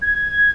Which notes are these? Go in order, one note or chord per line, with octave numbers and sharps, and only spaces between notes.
G#6